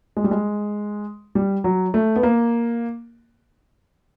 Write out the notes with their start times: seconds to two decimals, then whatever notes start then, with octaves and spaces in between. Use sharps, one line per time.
0.17 G#3
0.24 G3
0.31 G#3
1.35 G3
1.64 F#3
1.94 A3
2.16 B3
2.23 A#3